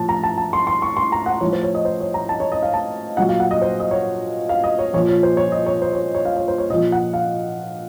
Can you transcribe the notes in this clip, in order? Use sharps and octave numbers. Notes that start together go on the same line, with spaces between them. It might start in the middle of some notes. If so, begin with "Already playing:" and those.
Already playing: A2 F3 A5
A#5
A5
A5
C6
C6
C#6
C6
A#5
F#5
A2 F3 C#5
C5
C#5
D#5
C5
C#5
A#5
A5
C#5
D#5
F5
A5
A#2 F#3 F#5
F5
F#5
D#5
C5
D#5
C#5
F5
D#5
C#5
A#2 F3 C#5
C#5
C5
C#5
D#5
C#5
C5
C#5
C#5
F5
C#5
C5
C#5
A#2 F3 D#5
F#5
F5